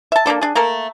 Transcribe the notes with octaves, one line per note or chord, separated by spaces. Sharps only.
E5 A5
A#3 C4 D4 A4
D4 G#4
A3 A#3 A4 A#4